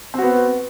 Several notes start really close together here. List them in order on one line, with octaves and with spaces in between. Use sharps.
C4 F#4 B3